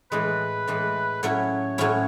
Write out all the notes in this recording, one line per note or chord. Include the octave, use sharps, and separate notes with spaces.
A2 E3 G#3 B4
A2 E3 G#3
A2 F#3 C#4 E4 C#5
A2 F#3 C#4 E4